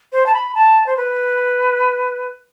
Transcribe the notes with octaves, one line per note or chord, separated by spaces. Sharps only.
C5
A5
B5
A5
C5
B4